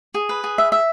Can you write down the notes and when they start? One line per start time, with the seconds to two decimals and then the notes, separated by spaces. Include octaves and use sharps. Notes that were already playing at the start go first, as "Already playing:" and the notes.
0.14 G#4
0.29 B4
0.44 G#4
0.58 E5
0.72 E5